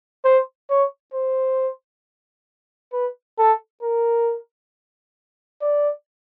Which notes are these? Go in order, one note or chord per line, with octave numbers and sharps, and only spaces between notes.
C5
C#5
C5
B4
A4
A#4
D5